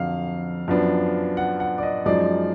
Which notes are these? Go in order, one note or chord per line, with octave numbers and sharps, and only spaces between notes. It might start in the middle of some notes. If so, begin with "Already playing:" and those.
Already playing: F2 D3 F#3 F5
F#2 F3 B3 D4
F#5
F#5
D5
D#5
F#2 F3 G#3 D#4 D5